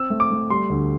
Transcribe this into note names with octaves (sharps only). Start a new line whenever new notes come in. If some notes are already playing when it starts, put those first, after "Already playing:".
Already playing: C4 E6
A3
D6
A3
G3 C6
D2